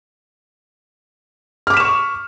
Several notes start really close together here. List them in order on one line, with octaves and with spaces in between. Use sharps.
F6 D6 B6 E7 C#6